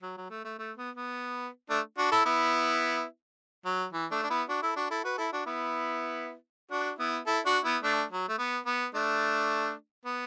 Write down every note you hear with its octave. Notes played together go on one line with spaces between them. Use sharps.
F#3
F#3
A3
A3
A3
B3
B3
A3 D4
D4 F#4
E4 A4
B3 E4
F#3
E3
A3 D4
D4
B3 E4
D4 F#4
E4 A4
D4 F#4
E4 A4
F#4 B4
E4 A4
D4 F#4
B3 E4
D4 F#4
B3 E4
E4 A4
D4 F#4
B3 E4
A3 D4
F#3
A3
B3
B3
A3 D4
B3